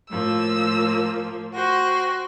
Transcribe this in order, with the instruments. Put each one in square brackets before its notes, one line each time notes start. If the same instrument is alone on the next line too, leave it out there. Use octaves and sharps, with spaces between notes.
[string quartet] A2 F3 A#3 [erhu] E6
[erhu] F#4 [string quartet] C5 G5 A#6